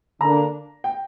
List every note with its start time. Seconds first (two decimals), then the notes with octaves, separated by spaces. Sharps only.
0.20 D3 A#3 D4 A#5
0.84 G5